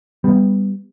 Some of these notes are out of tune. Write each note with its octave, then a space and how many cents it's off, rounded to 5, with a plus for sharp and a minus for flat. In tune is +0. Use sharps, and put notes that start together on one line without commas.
G3 +10 B3 +10